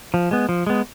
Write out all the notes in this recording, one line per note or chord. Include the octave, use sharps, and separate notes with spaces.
F3
G#3 B3
F3
G#3 B3